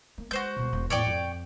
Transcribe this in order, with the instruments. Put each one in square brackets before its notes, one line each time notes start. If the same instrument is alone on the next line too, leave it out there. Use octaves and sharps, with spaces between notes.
[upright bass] A#3
[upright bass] G#3 [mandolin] F#4 C5 G6
[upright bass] C2 B2
E1 B3
[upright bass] E2 A2 [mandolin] C#5 D5 G5
[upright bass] F2